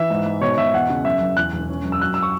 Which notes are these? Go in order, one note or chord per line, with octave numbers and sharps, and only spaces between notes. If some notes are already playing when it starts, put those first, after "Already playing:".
Already playing: E3 E5
G#2
G#2
B2 C#5
B2 E5
E2 F#5
C#3
F#2 E5
F#1
E2 F#6
E1
C#4
F#2
E6
F#3 F#6
E6
C#6